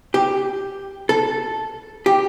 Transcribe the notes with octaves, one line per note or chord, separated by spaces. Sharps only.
G4
A4
G4